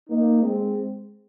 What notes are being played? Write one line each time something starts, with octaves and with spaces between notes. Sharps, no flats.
A#3 D#4
G#3 C4